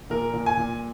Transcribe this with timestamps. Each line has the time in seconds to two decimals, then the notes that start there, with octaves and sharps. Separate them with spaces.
0.10 A#2 A#4
0.33 A#2
0.46 G#5
0.57 A#2